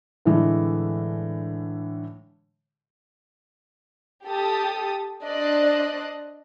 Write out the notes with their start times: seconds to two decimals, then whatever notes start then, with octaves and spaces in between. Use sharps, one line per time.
0.25 A2 D3 E3 G#3
4.26 G4 A4 A5 D#6
5.24 D4 C5 D5 D#5 F#6